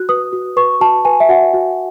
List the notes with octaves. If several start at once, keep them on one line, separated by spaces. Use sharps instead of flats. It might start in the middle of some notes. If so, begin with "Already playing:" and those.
Already playing: F#4 F#6
B4 D#6
F#4
B4 C#6
F#4 A5
B4 G#5
E5
F#4 F#5
F#4